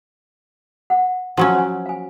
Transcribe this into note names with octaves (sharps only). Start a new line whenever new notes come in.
F#5
F3 F#3 C#4 F#4 F#5
C5 G#5
F5 G#5